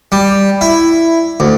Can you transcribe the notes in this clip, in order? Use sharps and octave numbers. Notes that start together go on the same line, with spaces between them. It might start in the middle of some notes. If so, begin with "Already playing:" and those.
G3
E4
D2